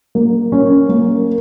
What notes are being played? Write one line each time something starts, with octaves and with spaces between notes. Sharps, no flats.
A#3
C#4
A#3